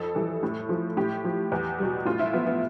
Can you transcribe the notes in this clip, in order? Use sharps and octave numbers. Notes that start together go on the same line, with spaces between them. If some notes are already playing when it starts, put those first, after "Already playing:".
Already playing: F2 A4
E3 G3
A2
F3
A2 G4
F3
E2
B2 G3
A2 F4
E4
F3 B3
B3